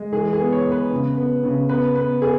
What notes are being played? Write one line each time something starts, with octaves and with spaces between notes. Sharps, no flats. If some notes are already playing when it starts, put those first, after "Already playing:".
Already playing: G#3
E3 G#4
G#4
B3
C#5
B3
B4
C#3
B3
C#3
B3 B4
B3 B4
B3 G#4